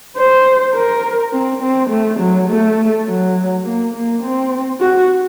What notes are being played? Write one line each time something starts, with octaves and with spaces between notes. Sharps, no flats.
C5
A#4
C4
C4
A3
F#3
A3
F#3
A#3
A#3
C4
F#4